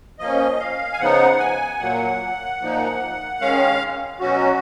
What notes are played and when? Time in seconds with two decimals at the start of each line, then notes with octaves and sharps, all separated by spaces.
0.19 F3 A#3 C#4 D#5
0.60 F5
0.93 G#5
1.00 C#3 F3 B3 D#4 F#5
1.39 G#5
1.79 A#2 F#3 A#3 F#5
2.60 A#2 F3 A#3 D#4
3.40 D#3 G#3 C#4 F5
4.20 B2 F#3 C#4 F#4